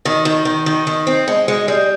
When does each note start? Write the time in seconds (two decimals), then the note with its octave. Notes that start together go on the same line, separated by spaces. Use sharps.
0.05 D#3
0.25 D#3
0.45 D#3
0.66 D#3
0.87 D#3
1.07 C4
1.28 G#3
1.48 G#3
1.68 G3